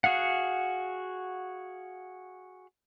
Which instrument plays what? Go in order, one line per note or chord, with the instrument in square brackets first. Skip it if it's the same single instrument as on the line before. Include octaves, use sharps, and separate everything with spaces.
[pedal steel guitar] F#4 G#4 F5 F#5